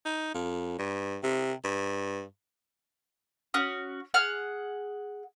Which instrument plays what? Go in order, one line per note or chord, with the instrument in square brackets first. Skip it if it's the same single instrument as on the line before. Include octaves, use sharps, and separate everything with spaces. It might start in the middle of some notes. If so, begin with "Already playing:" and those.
[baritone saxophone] D#4
F2
G2
C3
G2
[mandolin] C#4 F#4 D#6
G#4 F#5 F6